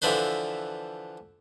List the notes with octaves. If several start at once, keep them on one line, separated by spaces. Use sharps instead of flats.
D3 E3 F3 D4 B4 C5